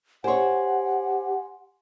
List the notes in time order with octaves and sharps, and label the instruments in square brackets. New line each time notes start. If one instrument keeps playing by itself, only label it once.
[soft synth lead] G4 [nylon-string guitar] C5 C#5 [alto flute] F#5 [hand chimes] G#5 C6